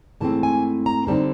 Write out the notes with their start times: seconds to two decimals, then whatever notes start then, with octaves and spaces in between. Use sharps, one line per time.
0.20 G#2 E3 A3 C4 A5
0.43 G#5
0.86 A#5
1.07 D3 G3 C4 D#4 A5